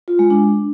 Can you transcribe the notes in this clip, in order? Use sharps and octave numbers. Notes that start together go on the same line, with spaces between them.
F4
G#3
D4